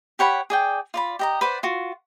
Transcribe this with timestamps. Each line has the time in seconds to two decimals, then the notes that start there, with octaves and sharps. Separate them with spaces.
0.19 G4 C#5 F#5 B5
0.50 G#4 D5 G5
0.94 F4 D5 B5
1.19 G4 D#5 A#5
1.41 B4 C5 D5 F#5
1.63 F4 F#4